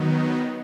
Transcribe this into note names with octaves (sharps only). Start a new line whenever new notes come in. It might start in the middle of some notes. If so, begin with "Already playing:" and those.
Already playing: D#3 F#3 B3 D#4